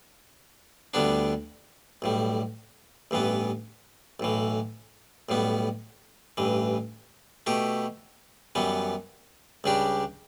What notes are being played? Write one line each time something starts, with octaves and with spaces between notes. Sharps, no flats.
D2 D3 G3 B3 D4
B1 A2 G3
A1 G2 E3 B3
B1 A2 E3
B1 A2 G3 B3
A1 G2 E3
B2 A3 E4 G4
F#2 E3 G3 B3
C#2 C#3 G3 D4 G4